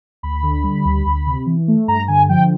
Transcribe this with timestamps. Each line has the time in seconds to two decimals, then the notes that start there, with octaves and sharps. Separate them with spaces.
0.23 D2 B5
0.43 D3
0.64 G3
0.85 D2
1.06 D2
1.27 C3
1.46 E3
1.68 A3
1.88 G2 A#5
2.08 D3 G#5
2.29 F3 G5